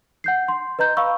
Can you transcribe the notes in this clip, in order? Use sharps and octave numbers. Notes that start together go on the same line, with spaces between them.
F#5 G6 C7
C6
B4 D#5 A#5 G6
F5 B5 C#6 E6